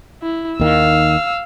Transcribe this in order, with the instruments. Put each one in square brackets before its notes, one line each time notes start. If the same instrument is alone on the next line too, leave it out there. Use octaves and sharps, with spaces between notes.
[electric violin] E4
[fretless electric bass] D#2 D#3 [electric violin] F5 E6